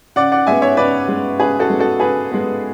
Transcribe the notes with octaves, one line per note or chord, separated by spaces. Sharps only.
C#3 D5 F#5
D5 F#5
G#3 B3 E5 G#5
C#5 E5
C#3 B4 D5
G#3 B3
C#3 G#4 B4
F#4 A4
G#3 B3
F#4 A4
C#3 G#4 B4
G#3 B3